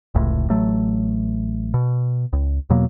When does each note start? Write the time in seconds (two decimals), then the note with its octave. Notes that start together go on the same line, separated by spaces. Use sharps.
0.15 F1 C#2 A2
0.49 A1 F#3 A3
1.74 B2
2.33 C#2
2.70 E2 B2 F#3 A#3